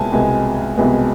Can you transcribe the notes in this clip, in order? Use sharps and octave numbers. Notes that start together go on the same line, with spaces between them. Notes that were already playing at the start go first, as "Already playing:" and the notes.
Already playing: C2 B2 G#3 B3 G#5 A5
C2 B2 G#3 B3
C2 B2 G#3 B3